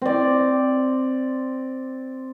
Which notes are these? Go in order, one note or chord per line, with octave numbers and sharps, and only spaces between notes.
C4 D5